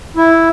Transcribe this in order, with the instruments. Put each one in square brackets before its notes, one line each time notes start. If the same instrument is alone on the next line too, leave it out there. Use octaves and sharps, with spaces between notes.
[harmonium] E4